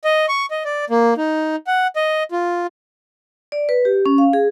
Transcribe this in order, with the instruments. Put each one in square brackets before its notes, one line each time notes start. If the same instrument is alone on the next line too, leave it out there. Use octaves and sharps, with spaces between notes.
[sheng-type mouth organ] D#5
C#6
D#5
D5
A#3
D#4
F#5
D#5
F4
[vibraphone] D5
B4
G4
C#4
F5
G#4